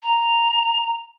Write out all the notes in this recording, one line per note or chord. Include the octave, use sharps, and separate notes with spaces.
A#5